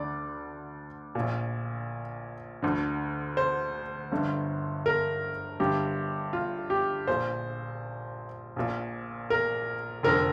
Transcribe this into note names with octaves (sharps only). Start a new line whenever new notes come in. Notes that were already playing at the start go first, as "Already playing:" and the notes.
Already playing: D2 D3 D5
A#1 A#2
D2 D3
C5
G1 G2 D3
A#4
G1 G2 D3 G4
F4
G4
A#1 A#2 C5
A#1 A#2
A#4
F1 F2 D3 A#4